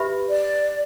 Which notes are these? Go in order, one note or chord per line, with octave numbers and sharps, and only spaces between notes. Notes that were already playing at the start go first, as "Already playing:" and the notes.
Already playing: G4 B4 E5 B5
D5